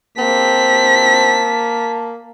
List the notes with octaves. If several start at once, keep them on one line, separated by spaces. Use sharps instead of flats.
A#3 C4 A5 B6